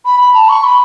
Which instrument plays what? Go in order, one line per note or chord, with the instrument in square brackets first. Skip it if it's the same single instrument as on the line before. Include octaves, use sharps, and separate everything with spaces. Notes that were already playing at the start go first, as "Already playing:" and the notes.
[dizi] B5
B5
A5
C#6
B5